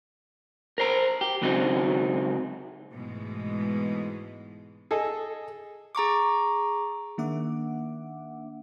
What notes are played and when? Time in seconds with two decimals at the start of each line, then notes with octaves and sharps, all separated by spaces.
0.78 A#4 C5 A#5
1.21 G4
1.42 C#2 C#3 F#3 C4 D#4
2.93 G#2 B2 E3 G#3 A3
4.91 G#4 A4 D#5
5.95 G#4 A#5 C#6 D6
7.18 D#3 A#3 D4 E5 F#5 D6